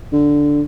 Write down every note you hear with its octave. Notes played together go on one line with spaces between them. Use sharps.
D3